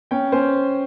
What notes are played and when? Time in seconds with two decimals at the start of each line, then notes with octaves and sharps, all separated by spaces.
0.11 C#4 G5
0.32 C#4 C5